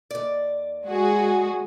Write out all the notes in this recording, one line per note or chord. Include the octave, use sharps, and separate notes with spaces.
D#2 D5
G#3 F#4 G#4